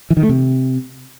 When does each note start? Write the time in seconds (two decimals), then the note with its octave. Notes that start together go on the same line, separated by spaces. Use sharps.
0.10 E3
0.17 D#3
0.23 A3
0.29 C3